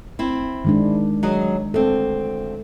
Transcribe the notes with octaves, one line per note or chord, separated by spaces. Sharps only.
C4 E4
D#3 G#3 D4
F#3 G#4 D#5
D2 C4 A4